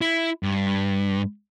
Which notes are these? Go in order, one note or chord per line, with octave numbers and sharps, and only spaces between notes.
E4
G2